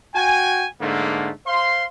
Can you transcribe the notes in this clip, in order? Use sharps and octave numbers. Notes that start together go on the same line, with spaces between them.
F#4 G5 G#5
G#2 D3 A3 A#3
C5 F5 C6